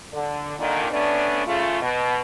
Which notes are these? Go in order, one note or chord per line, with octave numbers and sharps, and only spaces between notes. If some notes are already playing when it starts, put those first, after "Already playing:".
D3
A#2 D3 D#3
A3 B3 C#4 D4
C#3 A3 F4
B2